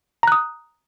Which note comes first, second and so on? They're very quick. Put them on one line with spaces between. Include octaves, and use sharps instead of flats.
A#5 F#6 D#6